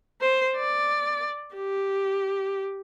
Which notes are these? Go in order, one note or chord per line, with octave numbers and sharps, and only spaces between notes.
C5
D5
G4